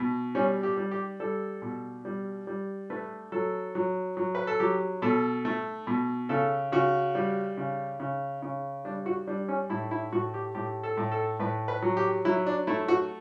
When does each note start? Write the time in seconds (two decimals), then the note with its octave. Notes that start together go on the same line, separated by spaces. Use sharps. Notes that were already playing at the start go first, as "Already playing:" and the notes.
Already playing: B2
0.35 G3 C#4
0.63 G4
0.77 G3
0.91 G4
1.20 G3 A4
1.62 B2
2.05 G3
2.47 G3
2.90 A3 B4
3.32 F#3 A4
3.75 F#3
4.17 F#3
4.35 B4
4.47 A4
4.60 F#3 G4
5.02 B2 A4
5.45 A3
5.87 B2
6.29 C#3 A4
6.72 C#3 F#4
7.15 G3
7.57 C#3
8.00 C#3
8.42 C#3
8.85 G3 D4
9.06 F#4
9.27 G3 D4
9.48 C#4
9.70 A2 E4
9.91 E4
10.12 A2 F#4
10.34 G4
10.55 A2 G4
10.83 A4
10.97 A2
11.12 A4
11.40 A2 B4
11.68 B4
11.82 F#3
11.97 G4
12.25 F#3 E4
12.47 D4
12.67 A3 E4
12.88 F#4